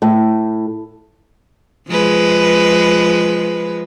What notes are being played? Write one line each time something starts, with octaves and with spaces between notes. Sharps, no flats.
A2
F3 G#3 B4